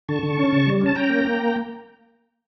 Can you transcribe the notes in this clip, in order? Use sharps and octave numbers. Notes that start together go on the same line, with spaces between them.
D3 A5 C#6
D3
C#4
C#3
G3
C#4 A5
C#4 G5 A#5
A#3
A#3